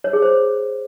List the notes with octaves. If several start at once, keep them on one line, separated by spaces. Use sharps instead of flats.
C#5
G#4
C5